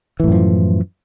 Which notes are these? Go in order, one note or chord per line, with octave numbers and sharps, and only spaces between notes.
F#2 A2 E3 F3